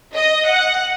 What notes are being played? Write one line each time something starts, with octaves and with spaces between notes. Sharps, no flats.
D#5
F#5